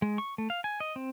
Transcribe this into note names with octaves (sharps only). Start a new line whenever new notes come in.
G#3
C#6
A3
F5
G#5
D#5
C4